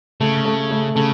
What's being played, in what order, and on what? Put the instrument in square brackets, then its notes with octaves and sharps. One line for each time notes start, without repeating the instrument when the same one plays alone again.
[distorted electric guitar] C#3 [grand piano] A3
[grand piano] A3
A3
[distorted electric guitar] C#3 [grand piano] A3